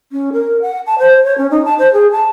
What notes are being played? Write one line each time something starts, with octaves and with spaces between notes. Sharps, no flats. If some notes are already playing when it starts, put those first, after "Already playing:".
C#4
A#4
F#5
A5
C5
C#5
C#4
D#4
A5
C5
G#4
A5